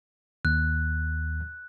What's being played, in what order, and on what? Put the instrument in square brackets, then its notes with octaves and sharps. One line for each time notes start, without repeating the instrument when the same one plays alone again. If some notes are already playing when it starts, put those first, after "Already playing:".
[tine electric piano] D#2 [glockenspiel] F#6